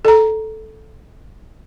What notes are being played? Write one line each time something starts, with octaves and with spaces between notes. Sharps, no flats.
A4 A#5